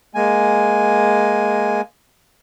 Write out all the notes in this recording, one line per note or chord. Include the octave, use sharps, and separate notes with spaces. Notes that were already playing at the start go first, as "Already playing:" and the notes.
G#3 A#3 G#5